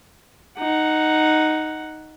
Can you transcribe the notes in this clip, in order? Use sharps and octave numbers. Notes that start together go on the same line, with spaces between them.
D#4 F#5